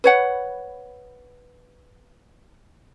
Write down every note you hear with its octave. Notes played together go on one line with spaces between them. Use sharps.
B4 C#5 F#5